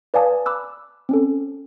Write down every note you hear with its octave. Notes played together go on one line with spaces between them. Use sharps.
B4 D5 F5 G#5 A5 D#6
B5 D6 E6 F#6
C4 C#4 A4